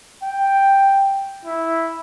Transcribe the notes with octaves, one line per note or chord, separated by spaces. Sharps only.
G5
E4